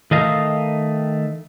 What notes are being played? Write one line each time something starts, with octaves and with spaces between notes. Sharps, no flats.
D#3 A3 D#5 F5